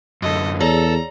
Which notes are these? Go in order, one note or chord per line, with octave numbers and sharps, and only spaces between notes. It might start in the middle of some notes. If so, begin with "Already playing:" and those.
F#2 D3 A4 D#5
E2 G#4 A4 C#5 D5 A#5